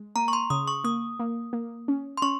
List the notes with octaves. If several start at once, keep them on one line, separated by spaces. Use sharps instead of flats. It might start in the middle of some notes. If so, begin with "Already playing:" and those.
Already playing: G#3
A#3 A#5
C#6
C6
C#3 D#6
C#6
A#3 D#6
A#3
A#3
C#4
C6
C#4 C#6